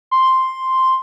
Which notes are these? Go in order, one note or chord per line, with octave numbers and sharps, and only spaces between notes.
C6